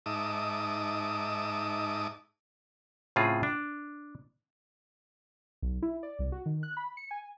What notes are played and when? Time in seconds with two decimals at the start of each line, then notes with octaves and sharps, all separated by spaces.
0.06 G#2 D#4 E5 A5 D6 D#6
3.16 A2 C#3 C4 F4 G#4
3.43 D4
5.62 B1
5.82 E4
6.03 D5
6.19 C2
6.32 F#4
6.46 D#3
6.63 F#6
6.77 B5
6.97 C#7
7.11 G#5